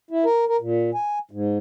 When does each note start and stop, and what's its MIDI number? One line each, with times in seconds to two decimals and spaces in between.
0.11 0.24 64
0.25 0.45 70
0.48 0.57 70
0.61 0.90 46
0.95 1.19 80
1.31 1.58 44